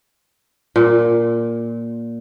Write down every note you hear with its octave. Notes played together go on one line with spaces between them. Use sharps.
A#2